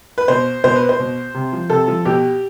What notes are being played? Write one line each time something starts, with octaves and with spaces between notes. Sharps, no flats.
B4
B2 C5
B2 C5
B4
C5
B2
C3
F3
C3 A4
F3
B2 G4